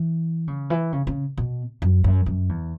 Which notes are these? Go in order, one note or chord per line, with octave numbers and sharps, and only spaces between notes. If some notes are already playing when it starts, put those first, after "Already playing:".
Already playing: E3
C#3
E3
C#3
C#3
B2
F#2
F#2
F#2
E2